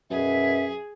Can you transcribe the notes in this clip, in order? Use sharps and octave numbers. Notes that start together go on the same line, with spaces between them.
F#2 B2 G#4 E5